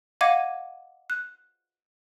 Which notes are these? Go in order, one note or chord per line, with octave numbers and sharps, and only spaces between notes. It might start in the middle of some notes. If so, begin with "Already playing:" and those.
D#5 F5 F#5 D6 G#6 D#7
F#6